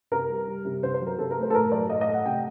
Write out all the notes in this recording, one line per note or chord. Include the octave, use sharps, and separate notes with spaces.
C3 A#4
G3
G3
C3
C3 C5
C5
F#3
A#4
C3 A4
A#4
A3
C5
A4
A2 A#4
F#3 D5
A2 D#5
D#5
A3
F#5
C3 G5